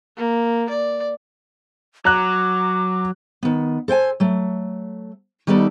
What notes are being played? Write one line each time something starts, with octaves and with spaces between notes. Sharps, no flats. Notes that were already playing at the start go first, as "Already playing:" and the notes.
A#3
D5
F#3 A#5 D6 F#6
D#3 B3
A4 C5 G5 G#5
F#3 A3
D#3 G3 B3 D#4 A4 D5